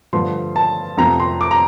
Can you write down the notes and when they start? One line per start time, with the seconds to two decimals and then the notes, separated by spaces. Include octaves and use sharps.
0.13 G2 D3 F3 A3 C6
0.56 A5
0.98 F2 C3 F3 A3 A#5
1.20 C6
1.41 D6
1.51 A#5